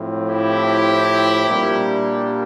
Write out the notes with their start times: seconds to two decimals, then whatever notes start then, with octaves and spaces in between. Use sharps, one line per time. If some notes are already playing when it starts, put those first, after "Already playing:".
Already playing: A2 F3 C4
0.29 E4 G4
1.47 A#2 G3 A#3 D4